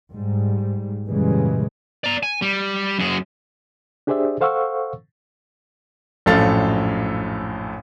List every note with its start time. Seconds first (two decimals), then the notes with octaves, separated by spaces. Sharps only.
0.13 G#2 G3
1.07 F#2 A#2 C#3 E3 G3 G#3
2.04 D5 A#5
2.23 G#5
2.42 G3
2.99 F#2 G#4
4.07 D4 G4 G#4 C5 D5 E5
4.41 A4 C5 F5 F#5 C#6 E6
6.26 A#1 F#2 A2 A4 F5 A6